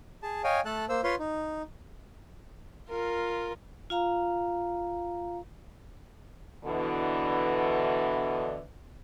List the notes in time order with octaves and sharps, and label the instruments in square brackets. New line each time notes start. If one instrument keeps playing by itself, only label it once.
[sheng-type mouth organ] G#4 A5
C#5 D#5 F5 G5 G#5
A3 A4 A5 F#6
A#3 C5 E6
F4 B4 C#5 F5 C6
D#4
[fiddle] F4 A#4
[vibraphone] F4 F5 A#5
[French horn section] B2 D3 E3